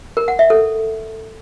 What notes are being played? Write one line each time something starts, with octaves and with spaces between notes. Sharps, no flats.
A#4
F#5
E5
A4